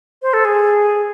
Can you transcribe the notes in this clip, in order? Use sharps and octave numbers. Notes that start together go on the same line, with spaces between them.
C5
A4
G#4